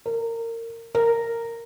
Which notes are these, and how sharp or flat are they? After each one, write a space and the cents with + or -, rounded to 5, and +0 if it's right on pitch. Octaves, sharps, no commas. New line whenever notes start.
A#4 -25
A#4 -10